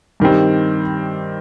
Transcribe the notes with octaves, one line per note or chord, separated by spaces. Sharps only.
G2 D#3 G3 C4